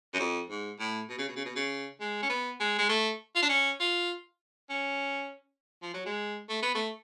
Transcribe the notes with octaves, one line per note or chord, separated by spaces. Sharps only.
F#2
F2
G#2
A2
B2
C#3
B2
C#3
B2
C#3
G#3
C#4
B3
G#3
G#3
A3
F4
D4
C#4
F4
C#4
F3
F#3
G#3
A3
B3
A3